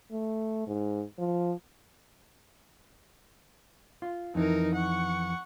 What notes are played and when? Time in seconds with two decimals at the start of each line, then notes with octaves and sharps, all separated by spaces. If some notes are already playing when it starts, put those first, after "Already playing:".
0.11 A3
0.67 G#2
1.18 F3
4.02 F4
4.35 F2 E3 D#4 A#4
4.75 F#5 C#6